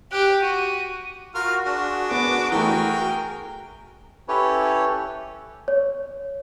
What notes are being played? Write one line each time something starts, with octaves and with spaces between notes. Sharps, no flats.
G4 F#6
F#4 D#7
F4 F#4 A#4 F6
D4 G#4
B3 D6
E3 A3 G#4 A#4 G5
C#4 E4 G4 A4 B4 C#5
C#5